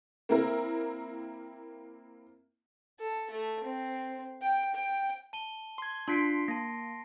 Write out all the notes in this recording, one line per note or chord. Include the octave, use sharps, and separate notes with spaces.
A#3 C4 E4 A#4
A4
A3
C4
G5
G5
A5 D#7 G7
C6 G#6
D4 F4 C6 B6 C7 D7
A#3 A5 A#6